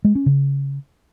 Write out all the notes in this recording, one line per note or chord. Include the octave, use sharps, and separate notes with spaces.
G#3
C#4
C#3